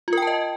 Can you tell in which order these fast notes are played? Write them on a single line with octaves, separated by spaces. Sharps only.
F4 A#4 G5 A5 D#5